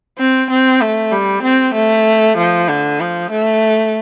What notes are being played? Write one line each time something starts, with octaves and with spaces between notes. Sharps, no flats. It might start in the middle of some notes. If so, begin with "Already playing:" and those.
C4
C4
A3
G3
C4
A3
F3
D3
F3
A3